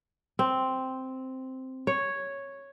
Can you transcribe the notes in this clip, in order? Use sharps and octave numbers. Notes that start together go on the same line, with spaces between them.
C4
C#5